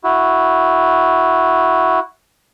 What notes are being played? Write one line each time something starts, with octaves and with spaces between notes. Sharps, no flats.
E4 F#4